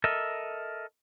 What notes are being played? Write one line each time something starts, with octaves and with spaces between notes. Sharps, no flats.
A4 A#4 D#5 E5